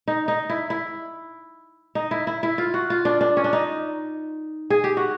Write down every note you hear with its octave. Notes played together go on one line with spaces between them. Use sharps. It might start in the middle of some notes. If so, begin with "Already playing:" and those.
D#4
D#4
E4
E4
D#4
E4
E4
E4
F4
F#4
F4
D4
D4
C#4
D4
D#4
G#4
G4
F#4